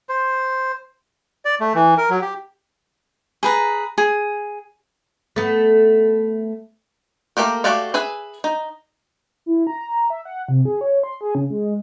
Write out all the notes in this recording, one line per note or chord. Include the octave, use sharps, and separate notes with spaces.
C5
D5
A3
E3
A#4
F#3
G4
G#4 B4 A#5
G#4
A3 B3
A3 A#3 G4 A#4
A3 F#4 G4 D5 F5
G#4 B4 E5 G#5
D#4
E4
A#5
E5
F#5
C3
G#4
C#5
C6
G#4
C#3
G#3